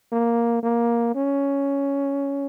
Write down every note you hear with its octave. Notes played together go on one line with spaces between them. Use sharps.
A#3
A#3
C#4